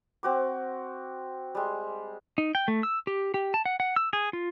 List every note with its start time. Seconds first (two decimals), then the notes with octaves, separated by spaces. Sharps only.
0.23 C4 F#4 D6
1.55 G3 G#3
2.38 D#4
2.55 G5
2.68 A3
2.83 E6
3.07 G4
3.34 G4
3.54 A5
3.66 F#5
3.80 F#5
3.96 E6
4.13 G#4
4.33 F4